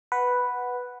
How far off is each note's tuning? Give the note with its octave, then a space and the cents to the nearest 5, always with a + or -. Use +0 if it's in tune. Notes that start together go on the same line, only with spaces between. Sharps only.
B4 +0 F#5 +0